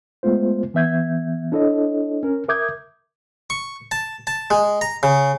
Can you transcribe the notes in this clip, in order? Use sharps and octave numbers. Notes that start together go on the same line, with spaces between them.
G#3 A3 B3 F4 C5
E3 B3 E5 G6 G#6
D4 E4 A4 C#5 D#5
C#4 A#4
A#4 E5 D6 D#6 G6 G#6
C#6
A5
A5
G#3
A#5
C#3